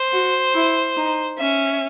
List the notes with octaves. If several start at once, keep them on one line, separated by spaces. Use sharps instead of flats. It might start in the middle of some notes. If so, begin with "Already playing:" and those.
Already playing: C5
F#4
E4
D#4
C#4 E5